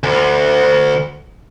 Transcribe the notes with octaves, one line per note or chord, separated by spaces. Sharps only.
D2